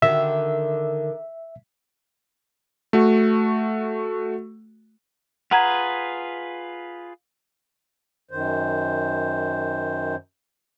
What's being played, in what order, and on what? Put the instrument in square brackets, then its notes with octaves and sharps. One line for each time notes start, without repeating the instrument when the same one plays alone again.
[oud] D3 D#3 F#4 [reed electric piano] E5
[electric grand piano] A3 F#4
[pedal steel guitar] F4 G#4 B4 [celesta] F#5 A#5 G#6
[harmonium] F#2 D#3 C5